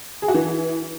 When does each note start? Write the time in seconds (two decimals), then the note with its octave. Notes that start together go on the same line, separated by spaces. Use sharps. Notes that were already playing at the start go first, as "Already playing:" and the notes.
0.22 G#4
0.28 F#4
0.34 E3